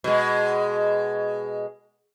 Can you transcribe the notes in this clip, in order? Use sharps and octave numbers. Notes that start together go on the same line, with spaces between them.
B2 G#3